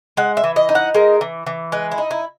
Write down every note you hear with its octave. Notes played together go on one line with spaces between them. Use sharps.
G#3 F#5
E5
E3
D#5
D#4
F#5
G#3 A#4
E3
E3
G#3 B4
E4
D#4
E4